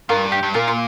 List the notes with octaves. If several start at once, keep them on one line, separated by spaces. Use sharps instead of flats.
G2 F4 A#4
G4
G2
A#2 F4 A#4
F4